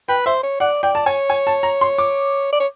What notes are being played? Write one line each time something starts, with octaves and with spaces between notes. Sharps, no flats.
B4 G5
C5 E5
C#5
D5 F#5
D5 G5
A5
C#5 G#5
G#5
A5
A#5
C6
D6
D5
C#5